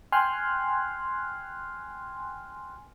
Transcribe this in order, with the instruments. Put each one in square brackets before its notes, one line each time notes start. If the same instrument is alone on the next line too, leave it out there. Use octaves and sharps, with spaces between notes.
[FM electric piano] G5 G#5 C6 F6 F#6